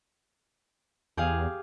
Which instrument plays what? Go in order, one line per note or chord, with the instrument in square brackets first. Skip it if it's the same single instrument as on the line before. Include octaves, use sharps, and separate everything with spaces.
[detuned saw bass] E2 [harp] G4 G#4 F5